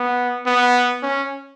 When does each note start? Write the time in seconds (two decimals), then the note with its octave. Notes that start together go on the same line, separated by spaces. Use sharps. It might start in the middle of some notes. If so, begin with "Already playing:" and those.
Already playing: B3
0.46 B3
1.03 C#4